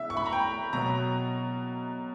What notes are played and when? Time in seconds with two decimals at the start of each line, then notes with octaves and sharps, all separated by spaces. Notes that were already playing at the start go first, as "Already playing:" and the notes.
Already playing: C#3 E3 B3 E5
0.10 C#6
0.17 B5
0.26 A#5
0.33 G5
0.73 B2 F#3 B3 A#5